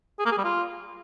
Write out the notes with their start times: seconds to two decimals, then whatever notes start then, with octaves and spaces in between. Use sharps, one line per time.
0.19 G#4
0.26 A#3
0.32 G#4
0.38 G3
0.44 F4